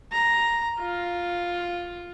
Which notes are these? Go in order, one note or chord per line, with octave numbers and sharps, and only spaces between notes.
A#5
F4